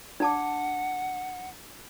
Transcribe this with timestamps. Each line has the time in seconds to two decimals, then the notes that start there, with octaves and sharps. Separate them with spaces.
0.20 D4 F#5 A5 D6